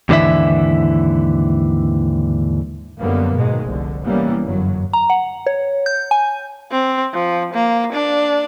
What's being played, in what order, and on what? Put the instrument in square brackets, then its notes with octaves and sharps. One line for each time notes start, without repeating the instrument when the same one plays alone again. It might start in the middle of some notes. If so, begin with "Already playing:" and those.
[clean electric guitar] D#2 G#2 D3 E3 E4 E5
[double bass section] F#2 D3 F#3 G3 A#3 B3
G#2 B2 D#3 G#3
F1 C2 D3
E3 G3 A#3 B3 C#4
G1 F#2 F#3
[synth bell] A#5
F#5
C#5
G6
G#5
[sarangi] C4
F3
A#3
D4